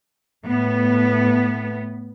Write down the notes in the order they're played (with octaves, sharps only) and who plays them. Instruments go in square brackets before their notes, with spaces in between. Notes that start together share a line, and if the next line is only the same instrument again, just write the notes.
[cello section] A2 B3